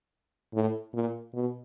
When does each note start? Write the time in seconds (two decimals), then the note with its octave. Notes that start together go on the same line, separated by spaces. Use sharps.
0.54 A2
0.94 A#2
1.34 B2